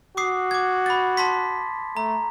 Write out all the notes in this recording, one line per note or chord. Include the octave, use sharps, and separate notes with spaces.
F#4 D6 D#6 C7
D6 G#6
B5 A6
A5 C6 B6
A3 A#5